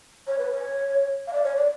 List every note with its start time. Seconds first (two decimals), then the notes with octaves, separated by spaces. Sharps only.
0.27 C#5
0.39 B4
0.51 C#5
1.27 F5
1.33 D5
1.44 C#5
1.56 D5